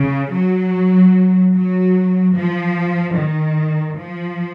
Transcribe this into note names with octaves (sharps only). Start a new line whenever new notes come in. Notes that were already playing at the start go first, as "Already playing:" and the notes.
Already playing: C#3
F#3
F#3
F3
D#3
F3